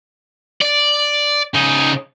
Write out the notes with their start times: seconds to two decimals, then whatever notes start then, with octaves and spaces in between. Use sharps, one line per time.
0.61 D5
1.55 C#3 D#4